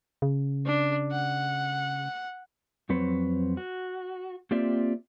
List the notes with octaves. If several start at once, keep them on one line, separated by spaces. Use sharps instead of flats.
C#3
D4
F#5
F2 F#3 C4 B4 C#5
F#4
A#3 C4 F4 G4 D5 E5